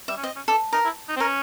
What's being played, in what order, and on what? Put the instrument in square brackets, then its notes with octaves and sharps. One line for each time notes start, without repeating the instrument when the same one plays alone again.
[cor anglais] G3 [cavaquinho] E5
[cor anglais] C#4
[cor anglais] C4 [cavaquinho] D#5
[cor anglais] C#4
[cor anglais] D4 [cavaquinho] A4
[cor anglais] D#4 [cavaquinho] A#4
[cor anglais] E4
D#4
C4
[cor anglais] C#4 [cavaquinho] A#4